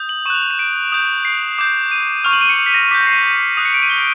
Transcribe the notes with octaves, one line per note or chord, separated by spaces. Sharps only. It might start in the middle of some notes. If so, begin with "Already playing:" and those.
Already playing: D#6 G6
F#7
C#6 F#6 E7 F7
F7
E7
D7
D#6 G6
C7
D6 G6
D#7
C#6 F6 F7
F#7
D#7
C#7
B6
A#6
D6 G6 B6
C7
A#6
D#6 F#6 C7
C#7
D7
D#7
G7